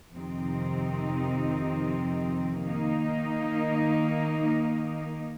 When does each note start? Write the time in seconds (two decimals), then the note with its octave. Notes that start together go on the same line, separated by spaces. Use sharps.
0.13 F2 C3 D#3 C4 D#4
2.66 D#3 A#3 D#4